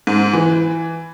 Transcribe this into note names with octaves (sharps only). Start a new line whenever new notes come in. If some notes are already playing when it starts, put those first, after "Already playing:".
G#2
E3